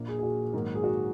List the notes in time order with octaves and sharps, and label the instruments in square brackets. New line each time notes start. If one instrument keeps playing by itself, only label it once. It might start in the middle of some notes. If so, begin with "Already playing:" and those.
Already playing: [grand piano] A#1 A#2 A#3
[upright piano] G#4
G#4
F#4
[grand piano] G#2 D#3 F#3 A#3
[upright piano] G#4
F#4